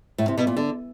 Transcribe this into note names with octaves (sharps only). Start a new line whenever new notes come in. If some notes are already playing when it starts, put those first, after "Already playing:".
A2
C3
B2
A#2
D3